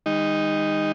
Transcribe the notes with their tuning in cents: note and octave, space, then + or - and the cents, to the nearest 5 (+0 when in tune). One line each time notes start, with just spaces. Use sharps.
D#3 +0 G#3 -45 D#4 +0